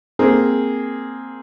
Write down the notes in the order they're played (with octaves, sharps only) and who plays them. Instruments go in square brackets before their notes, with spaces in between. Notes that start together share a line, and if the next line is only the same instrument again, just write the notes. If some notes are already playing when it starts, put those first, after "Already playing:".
[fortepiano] A#3 C4 G#4